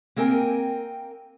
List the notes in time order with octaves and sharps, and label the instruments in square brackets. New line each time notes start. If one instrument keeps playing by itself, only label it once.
[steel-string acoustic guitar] A#3 C4 A#4 G5 G#5